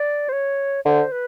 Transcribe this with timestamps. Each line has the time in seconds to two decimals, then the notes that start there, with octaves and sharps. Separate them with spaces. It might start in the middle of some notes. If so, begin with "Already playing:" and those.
Already playing: D5
0.29 C5
0.32 C#5
0.85 D3 C5
1.12 B4